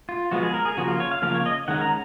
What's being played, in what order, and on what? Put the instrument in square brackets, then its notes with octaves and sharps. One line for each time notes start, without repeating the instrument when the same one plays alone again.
[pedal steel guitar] F4
F3 G#3 B3 F#4
G#4
A#4
G#4
C#3 F3 A#3 F#4
F4
C#5
F5
C#3 F3 A#3 F5
C#5
D#5
D#3 G#3 C#4 F#5
A#5